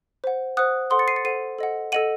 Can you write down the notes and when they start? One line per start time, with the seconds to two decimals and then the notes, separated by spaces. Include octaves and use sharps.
0.24 C5 F#5
0.57 C5 F#5 D#6 F#6
0.90 A4 C5 F#5 C6 D#6
0.99 A6 C#7
1.08 C7 D#7
1.16 A6 C#7
1.25 A4 C5 F#5 C7 D#7
1.58 A4 D#5 F#5
1.92 A4 D#5 F#5 D#7 F#7